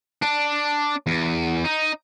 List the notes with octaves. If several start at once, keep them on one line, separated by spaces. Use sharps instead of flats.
D4
E2
D#4